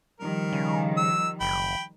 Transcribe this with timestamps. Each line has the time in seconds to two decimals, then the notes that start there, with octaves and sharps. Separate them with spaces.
0.20 D#3 F3 G3 A#4
0.53 C#3
0.97 E6
1.41 F#1 G5 B5